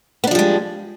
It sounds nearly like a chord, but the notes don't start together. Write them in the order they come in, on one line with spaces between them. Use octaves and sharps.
B3 D4 F3 G3 G#3